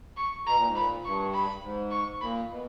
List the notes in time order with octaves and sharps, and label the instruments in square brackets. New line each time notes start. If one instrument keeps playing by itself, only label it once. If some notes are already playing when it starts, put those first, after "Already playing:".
[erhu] C#6
[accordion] B2 [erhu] A#5
[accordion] A#2
G#2
[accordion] A#2 [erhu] B5
[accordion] G2 [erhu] C#6
[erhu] B5
[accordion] G#2
[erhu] C#6
[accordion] A#2 [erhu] B5
[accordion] B2